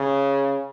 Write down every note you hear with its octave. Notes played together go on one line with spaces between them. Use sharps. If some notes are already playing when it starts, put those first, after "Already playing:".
Already playing: C#3